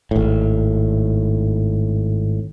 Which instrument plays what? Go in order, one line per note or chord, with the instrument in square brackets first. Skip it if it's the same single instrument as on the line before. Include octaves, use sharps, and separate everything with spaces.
[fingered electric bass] G#1 A2